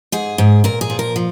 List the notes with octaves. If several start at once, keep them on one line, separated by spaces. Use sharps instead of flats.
G#2 G#4
G#2
A#2 A#4
G#4
F3
A#4
F3